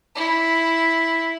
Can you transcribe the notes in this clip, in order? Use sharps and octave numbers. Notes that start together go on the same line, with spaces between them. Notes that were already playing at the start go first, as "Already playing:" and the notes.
E4